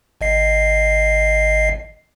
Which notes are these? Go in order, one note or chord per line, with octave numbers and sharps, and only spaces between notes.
G#1 D#5 C7